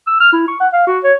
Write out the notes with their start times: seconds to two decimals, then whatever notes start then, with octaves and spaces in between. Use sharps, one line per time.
0.07 E6
0.20 F6
0.32 E4
0.48 C#6
0.60 F#5
0.73 F5
0.87 F#4
1.04 C#5